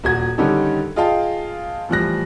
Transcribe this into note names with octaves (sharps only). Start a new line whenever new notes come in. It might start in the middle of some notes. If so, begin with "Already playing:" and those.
D#1 F#4 G#6
D3 D#3 G3 C#4 D#4 A4
F4 G#4 D#5 F5 G5 A5
A2 E3 F3 G3 F#6 A#6